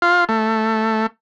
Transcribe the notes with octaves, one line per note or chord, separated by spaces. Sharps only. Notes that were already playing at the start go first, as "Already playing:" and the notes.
F4
A3